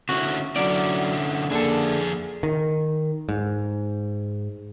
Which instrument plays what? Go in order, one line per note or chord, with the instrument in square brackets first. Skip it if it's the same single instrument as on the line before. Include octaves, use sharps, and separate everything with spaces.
[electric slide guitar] D3 C#4 E4 [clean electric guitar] F#4
[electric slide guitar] D3 C#4 E4 [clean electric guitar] F#3 D5 [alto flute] F#5
[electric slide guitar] F2 G#4 [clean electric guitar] D3 A4 [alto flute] A#3
[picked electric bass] D#3
G#2